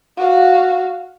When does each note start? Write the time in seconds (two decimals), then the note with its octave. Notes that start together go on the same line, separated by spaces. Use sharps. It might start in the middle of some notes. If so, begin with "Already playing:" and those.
0.17 F#4 F5